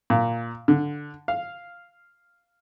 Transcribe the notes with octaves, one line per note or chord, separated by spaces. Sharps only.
A#2
D3
F5